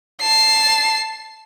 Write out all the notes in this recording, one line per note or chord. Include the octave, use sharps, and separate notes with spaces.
A5 C7